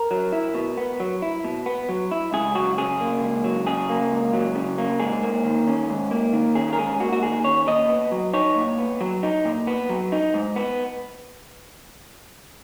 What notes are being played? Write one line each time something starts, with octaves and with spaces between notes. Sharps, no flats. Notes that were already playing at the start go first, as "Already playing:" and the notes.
Already playing: A#4
F#3
E4
B2
B3
F#3
E4
B2
B3
F#3
E4
C#2 G#4
F#3 F#4
C#3 G#4
A#3
C#2
F#3
C#3 G#4
A#3
C#2
F#3
C#3
A#3
G#2 G#4
A#3
D#3
C#4
G#2
A#3
D#3
C#4 G#4
A#4
G#2 G#4
A#3 F#4
F#4
D#3 G#4
C#4 C#5
A#2 D#5
B3
F#3
D#4 C#5
A#2
B3
F#3
D#4
A#2
B3
F#3
D#4
G#2
B3